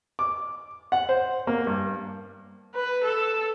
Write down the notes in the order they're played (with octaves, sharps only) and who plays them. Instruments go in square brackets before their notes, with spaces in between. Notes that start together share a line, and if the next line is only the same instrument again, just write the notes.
[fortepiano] D6
F#5
C5
A#3
G2
[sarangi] B4
A4